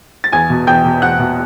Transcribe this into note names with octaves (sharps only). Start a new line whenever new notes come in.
A6
E2 G#5 G#6
B2
E2 G5 G6
B2
E2 F#5 F#6
B2